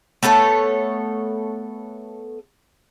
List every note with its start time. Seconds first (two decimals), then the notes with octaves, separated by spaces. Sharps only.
0.23 A3 B3 A4 C#5